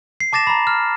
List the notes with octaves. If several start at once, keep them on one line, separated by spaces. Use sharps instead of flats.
C7
A5 D6 A6 A#6 E7
A#5 B5
F6